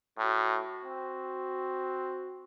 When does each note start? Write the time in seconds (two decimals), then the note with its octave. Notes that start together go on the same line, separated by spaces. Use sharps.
0.19 A2 F#4
0.83 C4